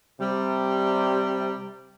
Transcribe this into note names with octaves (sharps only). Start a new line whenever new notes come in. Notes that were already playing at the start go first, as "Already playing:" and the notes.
C3 G3